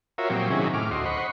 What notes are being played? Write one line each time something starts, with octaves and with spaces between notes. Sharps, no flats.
F4 F#4 A#4 C#5 E5
A#2 F3 F#3 C4 G4
C3 D#3 F#3 C#4 E4 G#4
A2 D6 F6
D2 F#4 D#5 C6
C5 D#5 F#5 B5 C#6